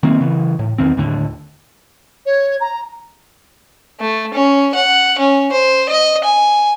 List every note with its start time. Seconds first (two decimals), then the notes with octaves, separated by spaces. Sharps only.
0.03 D#3 A#3 C4
0.21 C#3 E3
0.59 A2
0.78 E2 D#3 C4
0.97 D#2 A2 D3
2.25 C#5
2.60 A#5
4.01 A3
4.34 C#4
4.75 F#5
5.19 C#4
5.52 C5
5.89 D#5
6.24 G#5